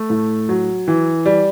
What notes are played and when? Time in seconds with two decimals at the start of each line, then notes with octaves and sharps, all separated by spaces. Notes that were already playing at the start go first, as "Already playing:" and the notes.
Already playing: A3
0.10 A2
0.49 F#3
0.88 E3
1.26 G3